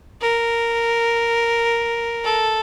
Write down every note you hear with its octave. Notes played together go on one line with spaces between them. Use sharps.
A#4
A4